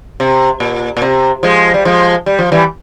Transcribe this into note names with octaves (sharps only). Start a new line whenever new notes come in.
C3
A#2
A#2
C3
F3 G#3
G3
F3 G#3
G3
F3
E3 G3